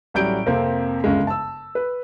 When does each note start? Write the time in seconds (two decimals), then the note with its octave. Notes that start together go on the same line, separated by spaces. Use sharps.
0.14 A1 F#3 G3 G6 D7
0.46 F2 C3 A#3 C4
1.04 G1 F#2 C#3 G#3
1.27 A5 E6
1.75 B4